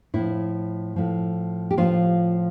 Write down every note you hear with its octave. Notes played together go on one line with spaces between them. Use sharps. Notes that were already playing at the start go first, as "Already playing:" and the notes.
A2 F3 E4
A2 F3
G4
A2 F3 F4